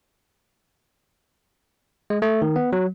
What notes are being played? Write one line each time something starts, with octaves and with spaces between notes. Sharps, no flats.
G#3
A3
D#3
B3
F#3